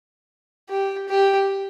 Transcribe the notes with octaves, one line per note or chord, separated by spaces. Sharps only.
G4
G4